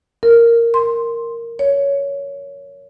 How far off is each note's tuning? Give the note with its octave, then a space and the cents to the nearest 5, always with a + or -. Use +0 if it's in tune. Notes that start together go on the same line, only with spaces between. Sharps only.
A#4 -5
C6 +0
C#5 +15